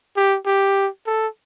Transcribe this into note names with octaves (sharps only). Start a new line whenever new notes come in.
G4
G4
A4